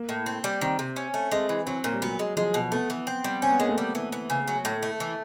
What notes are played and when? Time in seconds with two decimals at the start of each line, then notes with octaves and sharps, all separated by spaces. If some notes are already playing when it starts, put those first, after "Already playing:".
Already playing: A#3
0.09 A2
0.26 C4
0.44 G3
0.61 D#3 C4
0.79 C3
0.96 C#4
1.14 A3
1.31 G#3 C4
1.49 E3
1.66 F#3 C4
1.84 A#2 A#3
1.94 G3
2.02 F#3 B3
2.19 G#3
2.37 F3 G#3
2.54 B2
2.72 A3 B3
2.90 E3
3.07 C4
3.24 G3
3.42 C4 C#4
3.51 B3
3.59 G#3 A#3
3.69 A3
3.78 G3
3.95 E3
4.12 E3
4.30 C#3
4.48 F#3
4.65 A2
4.83 A3
5.00 E3